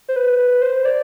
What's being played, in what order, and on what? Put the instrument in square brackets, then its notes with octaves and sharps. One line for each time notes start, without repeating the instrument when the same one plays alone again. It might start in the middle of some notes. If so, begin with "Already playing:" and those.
[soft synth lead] C5
B4
B4
C5
D5